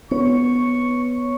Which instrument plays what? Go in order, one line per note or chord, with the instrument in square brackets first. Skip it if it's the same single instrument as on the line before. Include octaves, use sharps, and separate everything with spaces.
[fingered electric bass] B3 [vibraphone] C#5 [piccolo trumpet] C#6